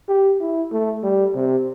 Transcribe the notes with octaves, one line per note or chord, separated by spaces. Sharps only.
G4
E4
A3
G3
C3